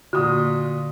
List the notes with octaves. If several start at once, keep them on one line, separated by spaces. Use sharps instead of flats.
A#2 D3 F4 F#4 D#6